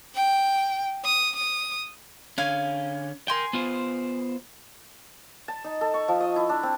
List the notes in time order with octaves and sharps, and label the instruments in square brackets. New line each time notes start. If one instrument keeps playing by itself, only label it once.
[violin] G5
D#6
D#6
[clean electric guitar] D3 C#4 [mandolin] F5 G#5
[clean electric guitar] A#4 G5 [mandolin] G#5 C6
[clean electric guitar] B3 F4 C5
[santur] A5
D#4
A4
C#6
F3
D#5
E4
D4
C4